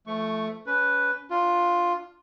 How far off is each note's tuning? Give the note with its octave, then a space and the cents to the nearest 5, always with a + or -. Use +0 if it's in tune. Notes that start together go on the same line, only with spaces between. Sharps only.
F3 -30 A3 +0 C#6 +0
C#4 +25 B4 +0
D4 +0 F4 +5